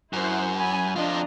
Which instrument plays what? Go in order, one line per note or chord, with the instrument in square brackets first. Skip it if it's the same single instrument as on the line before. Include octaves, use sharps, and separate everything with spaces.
[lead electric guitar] F#2 [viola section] E4 C5 F#5
[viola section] G#5 B5
[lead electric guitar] F2 F4 [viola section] D4 D#5 A#5